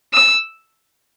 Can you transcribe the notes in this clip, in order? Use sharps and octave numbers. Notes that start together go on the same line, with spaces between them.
E6